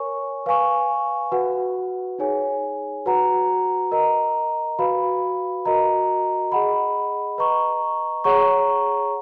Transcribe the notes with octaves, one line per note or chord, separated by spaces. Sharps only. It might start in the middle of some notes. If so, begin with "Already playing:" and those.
Already playing: A#4 C#5 G#5 C#6
B4 F5 G#5 C#6
F#4 B4 F#5
D#4 G#4 C#5 G#5
F#4 B4 F#5 A#5
A#4 D#5 A#5
F#4 B4 F5 B5
F#4 A#4 D#5 A#5
G#4 D#5 F#5 B5
B4 D#5 A#5 C#6
G#4 C#5 F#5 A#5 C#6